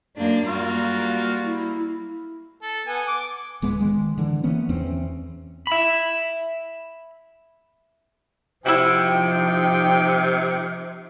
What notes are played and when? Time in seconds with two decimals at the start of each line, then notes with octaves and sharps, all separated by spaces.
0.17 F#2 A#3 D4
0.48 G3 A#3 F4 F#4
1.43 E4
2.63 A4
2.87 B3 G#5
3.08 D6
3.62 D1 G#3 B3
3.81 D#3 G#3
4.18 D3 E3
4.44 E3 A#3 B3 C#4
4.69 E2 E3 C4 C#4
5.67 E5 B5
8.66 C3 F3 D#4 E4 F#4 G5